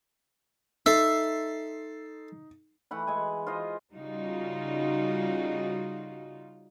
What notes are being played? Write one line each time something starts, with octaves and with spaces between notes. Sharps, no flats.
D#4 A4 E5 C6
E3 A3 F#5 B5
G#3 G#5
F4 C5 D#5
C#3 G3 D#4 F4 F#4